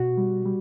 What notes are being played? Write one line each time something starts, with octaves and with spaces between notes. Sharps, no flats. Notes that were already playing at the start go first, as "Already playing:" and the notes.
Already playing: B2 F#4
G3
G3